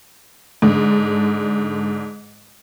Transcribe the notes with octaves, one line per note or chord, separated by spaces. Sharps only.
G#2 D3